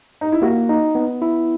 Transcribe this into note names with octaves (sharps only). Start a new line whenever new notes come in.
D#4
E4
A#3 F#4
D#4
B3
E4